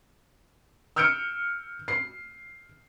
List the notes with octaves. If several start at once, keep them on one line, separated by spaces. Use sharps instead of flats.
E6 F6 G6 C#7 D7
C7